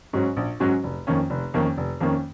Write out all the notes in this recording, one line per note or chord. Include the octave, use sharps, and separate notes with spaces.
G#2 F#3 C#4 F#4
A#1
G#2 F#3 C#4 F#4
F1
F2 D#3 A#3 C#4
F1
F2 D#3 A#3 C#4
F1
F2 D#3 A#3 C#4